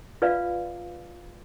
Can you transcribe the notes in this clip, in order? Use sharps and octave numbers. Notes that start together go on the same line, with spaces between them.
F4 B4 D5 E5 F5